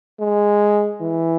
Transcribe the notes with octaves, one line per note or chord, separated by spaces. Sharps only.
G#3
E3